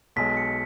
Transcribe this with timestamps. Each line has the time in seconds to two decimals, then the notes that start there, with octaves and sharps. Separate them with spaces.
0.16 B1 B2 G#3 B6
0.37 C#7